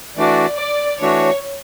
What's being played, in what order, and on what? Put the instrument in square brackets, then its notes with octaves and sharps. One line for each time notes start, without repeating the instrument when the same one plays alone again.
[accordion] E3 A3 D4 F#4 [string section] D5
[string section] D5
[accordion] E3 A3 D4 F#4 [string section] C#5